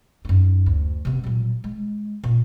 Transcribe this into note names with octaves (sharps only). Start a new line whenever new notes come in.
F#2 D#4
D2
C3 B3
A#2 F#3
G#3
A#2